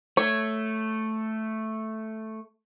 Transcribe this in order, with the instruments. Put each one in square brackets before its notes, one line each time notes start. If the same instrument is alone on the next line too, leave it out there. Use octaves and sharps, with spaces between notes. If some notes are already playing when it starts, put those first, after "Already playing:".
[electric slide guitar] A3 [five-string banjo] C#5